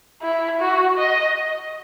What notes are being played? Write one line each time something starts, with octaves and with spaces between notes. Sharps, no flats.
E4
F#4
D#5